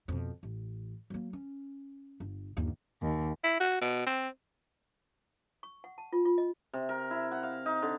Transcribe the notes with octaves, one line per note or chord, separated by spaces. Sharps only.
F2 B2
A1
F#3 A#3
C#4
G1
G1 D#2
D#2
E4
F#4
B2
C4
C#6
F#5
A5
F4
F4
D#5
C3
A#4
E4
F#5
F5
D#4
D3